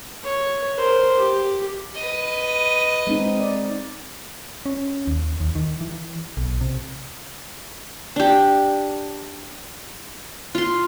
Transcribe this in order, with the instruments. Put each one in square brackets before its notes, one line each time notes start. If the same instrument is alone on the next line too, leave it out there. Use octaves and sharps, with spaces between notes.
[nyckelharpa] C#5
A#4 C5
G4
[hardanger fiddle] B4 D#5
[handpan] G#3 C4 D#4
D5
[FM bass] C#4
D#2
D#2
D#3
E3
B1
C3
[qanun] D4 G4
F4 C6